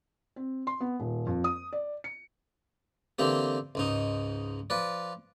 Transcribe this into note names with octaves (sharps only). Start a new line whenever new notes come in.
C4
C6
B3
D#1
F2
D#6
D5
C#7
D3 E3 A#3 C4 G4
C#2 G#2 D#4
F3 B4 D5